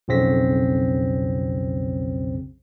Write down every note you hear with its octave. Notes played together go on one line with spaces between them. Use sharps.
B1 F2 C#3 C4 A#6 B6